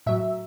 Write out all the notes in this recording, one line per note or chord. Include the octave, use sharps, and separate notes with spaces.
A2 F#3 E5